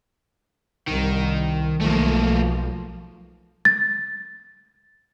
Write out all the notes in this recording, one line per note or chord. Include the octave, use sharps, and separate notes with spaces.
C2 D#3
B1 F3 A3 A#3
A6